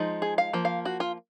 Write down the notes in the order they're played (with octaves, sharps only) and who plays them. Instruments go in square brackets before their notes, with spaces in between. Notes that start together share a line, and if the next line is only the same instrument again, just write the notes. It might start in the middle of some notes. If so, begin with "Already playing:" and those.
Already playing: [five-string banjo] F3 G#3 D#4
G#4
F5
F3 A#3
F5
F#4
F4